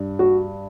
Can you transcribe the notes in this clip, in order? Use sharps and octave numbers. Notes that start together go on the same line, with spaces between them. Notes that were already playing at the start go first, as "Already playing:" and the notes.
Already playing: G2
F#4